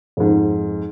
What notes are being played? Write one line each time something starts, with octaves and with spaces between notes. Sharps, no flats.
F2 G#2